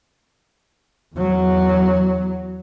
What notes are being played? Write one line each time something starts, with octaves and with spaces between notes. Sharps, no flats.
E2 F#3